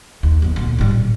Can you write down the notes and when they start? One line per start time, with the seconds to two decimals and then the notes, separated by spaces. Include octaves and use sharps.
0.23 D#2
0.42 F#1 B3
0.56 D2 A#2
0.79 G#2 G3
0.91 A2